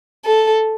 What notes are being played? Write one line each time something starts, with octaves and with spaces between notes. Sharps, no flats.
A4